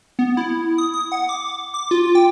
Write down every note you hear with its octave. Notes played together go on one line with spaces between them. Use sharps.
B3
E4
D#6
D#6
F#5
D6
D6
F4
G5